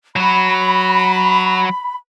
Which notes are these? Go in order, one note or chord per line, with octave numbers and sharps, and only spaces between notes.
F#3 F#4 B5